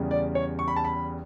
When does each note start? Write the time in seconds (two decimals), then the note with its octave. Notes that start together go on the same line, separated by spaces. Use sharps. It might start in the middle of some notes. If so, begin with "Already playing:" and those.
Already playing: E2 C#3 G3
0.11 D5
0.35 C#5
0.59 C#6
0.68 B5
0.76 A5
0.84 B5